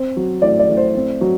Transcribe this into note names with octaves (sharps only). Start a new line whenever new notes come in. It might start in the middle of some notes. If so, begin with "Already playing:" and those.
Already playing: C4
F#3
A2 D5
D5
A2
C5
C4
F#3